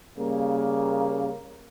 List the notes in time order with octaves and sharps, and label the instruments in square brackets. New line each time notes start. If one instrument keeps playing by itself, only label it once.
[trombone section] C#3 G3 A#3